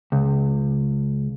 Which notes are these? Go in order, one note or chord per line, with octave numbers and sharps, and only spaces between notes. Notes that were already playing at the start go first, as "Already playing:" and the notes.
C#2